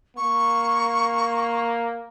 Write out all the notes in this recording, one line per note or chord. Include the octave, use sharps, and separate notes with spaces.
A#3 C#6